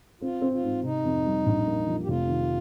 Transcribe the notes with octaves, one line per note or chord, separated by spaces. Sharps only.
C4 F4
C4
F4
G#2
C3 D#4
F2
G3
A#1
A#3
F3
G4
F1 F4
D#3